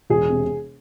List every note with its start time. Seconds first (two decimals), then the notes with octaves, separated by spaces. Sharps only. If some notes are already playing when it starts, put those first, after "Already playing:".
0.10 E1 G#4
0.30 C3